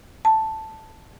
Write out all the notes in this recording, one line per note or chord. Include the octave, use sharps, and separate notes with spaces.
A5